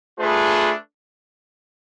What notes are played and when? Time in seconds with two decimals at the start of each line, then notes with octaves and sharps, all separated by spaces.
0.19 A3 D4 F4 G#4 B4